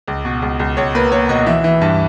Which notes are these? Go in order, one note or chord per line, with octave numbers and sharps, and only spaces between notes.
C#2
B2
C#2
C#2
C#2 C#5
A#3 B4
A#3 C#5
B2 D#5
E3 E5
E3
G2